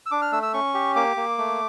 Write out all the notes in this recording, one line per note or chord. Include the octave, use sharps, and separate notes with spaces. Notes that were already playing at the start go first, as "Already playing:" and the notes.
E6
D4 D6
F6
A3 E6
E6
C#4 C#6
G4
A#3 D6
A#3
A3